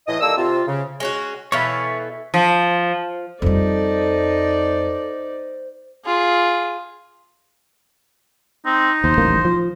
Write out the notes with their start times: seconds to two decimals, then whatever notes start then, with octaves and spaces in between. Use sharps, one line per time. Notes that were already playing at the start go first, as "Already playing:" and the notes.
0.08 A2 E3 D#5
0.21 D#3 G3 A#3 A4 E6
0.37 C3 F4
0.67 C#3
1.00 G#3 C#4 F#4
1.52 B2 E3 A4 C#5 F5 B5
2.34 F3
3.42 F2 G3 D#4 A4 C5 D5
6.05 F4 G#4
8.66 C4 D#4
9.04 D#2 C5
9.18 D#1 A1 A#3
9.45 F3